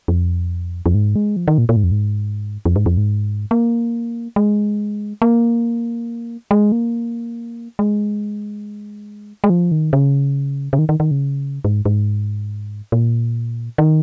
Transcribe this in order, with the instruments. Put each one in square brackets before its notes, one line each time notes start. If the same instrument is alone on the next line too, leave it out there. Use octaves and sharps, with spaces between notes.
[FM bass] F2
F2
G#2
G#3
F3
D#3
A#2
A#2
G#2
F2
G#2
F2
G#2
F2
G#2
A#3
G#3
A#3
G#3
A#3
G#3
G#3
F3
D#3
C#3
C#3
D#3
D#3
D#3
C#3
G#2
G#2
A#2
D#3